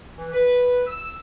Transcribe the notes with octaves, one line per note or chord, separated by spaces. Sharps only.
E3
B4
E6